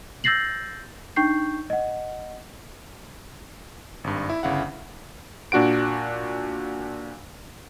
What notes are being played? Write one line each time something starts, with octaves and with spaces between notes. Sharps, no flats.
E6 G6 A6 A#6 C7 F#7
D4 D#4 G5 C#6 G6 C7
D#5 F#5
G#1 G2
E4
G1 C#3 E4 F5 F#5
A#2 D4 F#4 F#5 D7